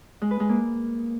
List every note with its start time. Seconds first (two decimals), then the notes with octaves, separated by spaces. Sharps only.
0.22 G#3
0.31 B4
0.40 G#3
0.49 A#3